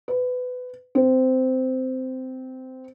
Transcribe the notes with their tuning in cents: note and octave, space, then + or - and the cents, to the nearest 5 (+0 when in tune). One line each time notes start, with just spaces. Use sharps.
B4 +20
C4 -15